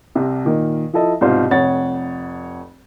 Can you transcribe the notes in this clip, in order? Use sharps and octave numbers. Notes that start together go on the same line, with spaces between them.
C2 C3
A#2 D#3
F3 E4 A4 D#5
C2 G#2 B2 F4 C5
F1 F2 C#5 F#5 A6